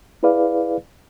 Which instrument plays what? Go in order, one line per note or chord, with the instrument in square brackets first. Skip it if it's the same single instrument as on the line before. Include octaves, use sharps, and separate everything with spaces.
[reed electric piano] E4 G#4 B4 D5 F5